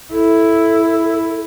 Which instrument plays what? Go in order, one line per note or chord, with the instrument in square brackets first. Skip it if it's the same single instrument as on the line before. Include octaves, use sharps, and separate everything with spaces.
[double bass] E4 [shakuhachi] A4